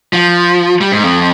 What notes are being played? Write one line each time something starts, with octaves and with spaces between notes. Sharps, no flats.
F3
G3
G#2
F2